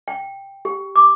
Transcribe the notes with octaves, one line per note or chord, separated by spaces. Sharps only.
G5
G4
D6